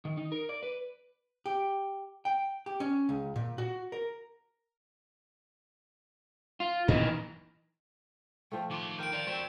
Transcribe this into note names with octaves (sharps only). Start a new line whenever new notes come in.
D#3
D#4
A#4
D5
B4
G4
G5
G4
C#4
C#2
A#2
F#4
A#4
F4
A#2 E3 A#3 B3 D#4
F3 A3 G5
D#3 C6 D6
A#4 G5 G6 D7
C4 D5 F5
C4 F#4 E5